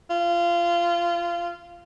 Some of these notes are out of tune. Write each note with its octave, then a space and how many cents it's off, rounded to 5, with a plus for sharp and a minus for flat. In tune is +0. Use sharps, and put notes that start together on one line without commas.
F4 -20